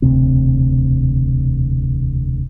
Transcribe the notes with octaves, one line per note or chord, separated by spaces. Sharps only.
E1 D2 C3 C4